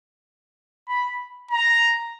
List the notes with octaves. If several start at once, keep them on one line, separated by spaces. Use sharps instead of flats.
B5
A#5